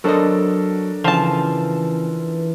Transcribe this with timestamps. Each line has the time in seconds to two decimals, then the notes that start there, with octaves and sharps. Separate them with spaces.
0.04 F#3 D4 A4 A#4 C5 D#5
1.04 C#3 E3 F3 A5